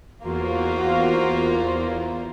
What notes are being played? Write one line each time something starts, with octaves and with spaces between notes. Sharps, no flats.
E2 A#3 F4 F#4 C5